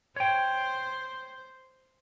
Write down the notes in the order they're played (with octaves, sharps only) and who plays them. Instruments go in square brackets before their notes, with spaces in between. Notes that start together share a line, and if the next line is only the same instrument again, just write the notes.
[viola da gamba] C5 [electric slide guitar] C#5 G5